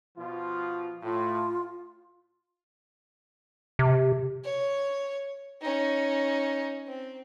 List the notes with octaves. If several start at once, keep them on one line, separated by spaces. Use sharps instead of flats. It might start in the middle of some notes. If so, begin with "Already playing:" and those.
B2 F3 F4
A2 F4
C3
C#5
C#4 D#4
C4